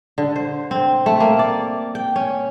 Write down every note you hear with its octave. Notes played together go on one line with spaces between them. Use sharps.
D3
C5
C4
A3
A#3
D5
G5
C#4